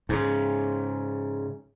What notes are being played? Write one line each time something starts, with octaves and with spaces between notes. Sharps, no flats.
G#2 C#3